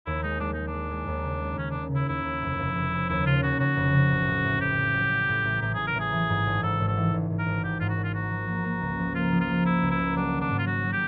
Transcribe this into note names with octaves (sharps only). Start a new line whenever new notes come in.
D#2 E4
G#3 D#4
G#3 D4
G#3 D#4
D4
G#3
G#3
D#2
C#3
G#3
D#2 C#4
C#3 D4
C#3 E4
D#2 E4
D#2
F1
F1
F1
C#3
D#2 E4
C#3 F4
C#3 F#4
C#3 F#4
F1
C#3
A1
A2
A1
A2 G4
A1
F#3
A1
A2
A1
A1 G4
A1 G#4
A#4
A1 G#4
E3
G#2
G#1
G#2 A4
G#1
A4
E3
G#1
G#1
A#4
G#1
G#2 G4
G#2 F4
F#4
G#1
F4
A#3 F#4
F3
A#3
A#3
C#2
F3
A#3 F4
F3
F4
A#3
A#3 E4
C#2
E4
A#3
F#3 D4
D#3
D4
G#2
F4
F#3 F#4
F#3
G4